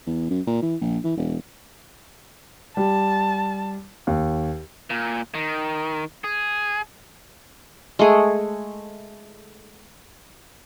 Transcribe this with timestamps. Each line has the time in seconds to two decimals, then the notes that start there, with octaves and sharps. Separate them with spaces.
0.07 E2
0.30 F#2
0.47 A#2
0.62 E3
0.81 A#1
1.04 E3
1.17 E1
2.77 G3 A5
4.07 D#2
4.90 A#2
5.35 D#3
6.24 G#4
7.99 G#3 A3 G#4